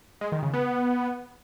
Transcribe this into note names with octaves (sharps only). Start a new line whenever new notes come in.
G#3
D#3
C#3
B3